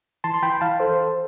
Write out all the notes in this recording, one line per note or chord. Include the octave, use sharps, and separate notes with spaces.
E3 A5 C6
C6
E3 G5 B5
E3 F5 A5
A4 C5